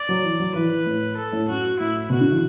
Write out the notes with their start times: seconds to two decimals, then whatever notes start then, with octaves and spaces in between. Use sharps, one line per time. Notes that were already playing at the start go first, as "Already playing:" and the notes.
Already playing: D5
0.09 F#3
0.24 E3
0.40 F#3
0.55 E3 B4
0.70 E3
0.86 A2
1.17 A4
1.32 A2
1.48 F#2 F#4
1.79 A2 E4
2.10 B2 F#4
2.21 D3
2.31 E3